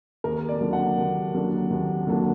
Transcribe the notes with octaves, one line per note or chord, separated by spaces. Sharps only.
D#2 A#4
D5
D3 F#3 A#3 D4
F#5
D#2
D3 F#3 A#3 D4
D#2
D3 F#3 A#3 D4